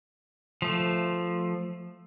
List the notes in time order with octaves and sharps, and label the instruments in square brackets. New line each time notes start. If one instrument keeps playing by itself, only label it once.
[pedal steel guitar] F3 A3